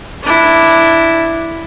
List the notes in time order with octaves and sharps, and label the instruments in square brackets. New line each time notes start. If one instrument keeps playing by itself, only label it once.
[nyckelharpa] D4 E4